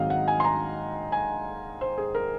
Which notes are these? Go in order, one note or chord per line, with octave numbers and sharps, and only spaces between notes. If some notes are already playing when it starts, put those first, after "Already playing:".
Already playing: G#2 D#3 F#3 C4 D#4 D#5 F5
F#5
G#5
C6
A#5
G#5
C5
G#4
A#4